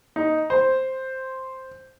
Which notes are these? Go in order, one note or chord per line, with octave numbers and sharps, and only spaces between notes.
D#4
C5